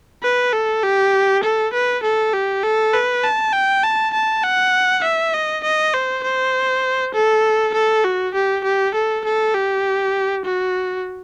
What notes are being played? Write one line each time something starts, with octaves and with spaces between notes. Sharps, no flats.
B4
A4
G4
A4
B4
A4
G4
A4
B4
A5
G5
A5
A5
F#5
E5
D#5
D#5
C5
C5
A4
A4
F#4
G4
G4
A4
A4
G4
F#4